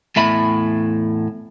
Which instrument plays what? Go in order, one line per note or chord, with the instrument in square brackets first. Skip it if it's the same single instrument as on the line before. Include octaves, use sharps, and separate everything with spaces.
[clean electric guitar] E2 A2 E5 B5